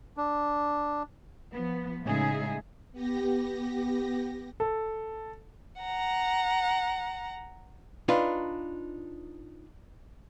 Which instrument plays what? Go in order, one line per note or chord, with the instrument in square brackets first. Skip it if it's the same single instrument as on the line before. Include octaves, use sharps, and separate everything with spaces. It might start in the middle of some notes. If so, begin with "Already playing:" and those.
[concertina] D4
[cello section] F3 B3
A2 C#3 G#3 D#4 G#4 E5
[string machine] B3 G4 A#6
[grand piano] A4
[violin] F#5 A#5
[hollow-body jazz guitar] D4 D#4 F4 B4